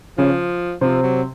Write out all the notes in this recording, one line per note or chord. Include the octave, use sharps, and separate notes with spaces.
C#3 F3 C#4
C3 F3 C4
F#3